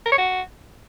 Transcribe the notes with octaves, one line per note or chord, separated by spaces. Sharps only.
A#4
C#5
F#4